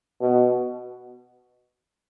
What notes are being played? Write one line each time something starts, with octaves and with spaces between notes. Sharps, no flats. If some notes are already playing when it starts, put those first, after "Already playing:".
B2